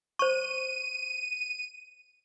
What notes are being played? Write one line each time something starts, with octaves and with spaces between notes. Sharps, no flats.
C5 C#6 D#7